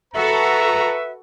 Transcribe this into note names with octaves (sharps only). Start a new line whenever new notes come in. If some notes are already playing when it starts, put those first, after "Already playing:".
F#4 A4 B4 E5 A#5